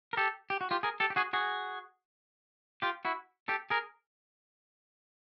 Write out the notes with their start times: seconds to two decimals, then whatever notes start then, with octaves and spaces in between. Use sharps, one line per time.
0.13 A#4
0.17 G4 A4
0.50 G4
0.61 F#4
0.71 F4 G4
0.83 G#4 A#4
1.00 G4 A4
1.10 G4
1.16 F#4 G#4
1.33 F#4 G#4
2.82 F4 G4
3.05 E4 F#4
3.48 G4 A4
3.70 G#4 A#4